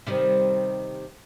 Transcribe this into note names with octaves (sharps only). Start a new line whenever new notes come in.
C3 D#3 G3